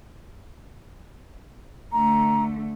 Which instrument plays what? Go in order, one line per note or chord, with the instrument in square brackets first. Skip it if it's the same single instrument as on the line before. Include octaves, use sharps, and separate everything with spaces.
[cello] D3 A3 [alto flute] A#5